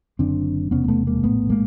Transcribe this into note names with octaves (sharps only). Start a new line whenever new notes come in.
F#1 F#2 D3 C4 D4
E1 E2 C3 B3 C#4
A#3
A3 B3
G#3 A#3
A#1 A2 A3 B3
G#3 A#3